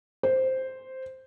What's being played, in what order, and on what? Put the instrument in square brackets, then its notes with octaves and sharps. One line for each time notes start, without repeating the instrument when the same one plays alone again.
[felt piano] C5